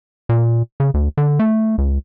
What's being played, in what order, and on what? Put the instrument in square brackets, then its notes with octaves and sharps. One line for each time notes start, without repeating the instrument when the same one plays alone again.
[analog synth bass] A#2
C#3
D2
D3
A3
C#2